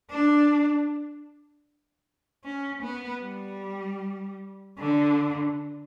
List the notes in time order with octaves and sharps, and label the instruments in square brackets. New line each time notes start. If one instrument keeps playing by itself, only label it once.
[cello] D4
C#4
B3
G3
D3